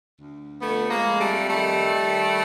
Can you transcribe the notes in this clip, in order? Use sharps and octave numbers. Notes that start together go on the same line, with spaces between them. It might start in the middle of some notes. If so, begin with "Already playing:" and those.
D2
F2 A3 B3
G#3 A#3
F2
G3 A3
D#3 G3 A3
D#3